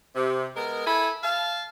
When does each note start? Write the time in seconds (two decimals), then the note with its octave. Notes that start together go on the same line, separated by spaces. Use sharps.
0.16 C3
0.56 G#3 B3 A#4
0.87 E4 A4 G#5 B5
1.23 F5 A5